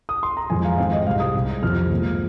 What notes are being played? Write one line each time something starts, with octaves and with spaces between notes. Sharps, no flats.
D#6
C6
A#5
F2 F3 G#3 G#5
F5
G#2 D#3 C4 F5
D#5
C2 C3 G#3 C4 F5
D#6
C2 C3 G#3
F2 C3 F3 F6
G#2 F3 A#3